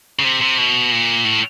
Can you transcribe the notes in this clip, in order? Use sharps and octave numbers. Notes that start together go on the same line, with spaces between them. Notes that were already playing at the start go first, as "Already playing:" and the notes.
C#3
C3
C3
B2
A#2
A2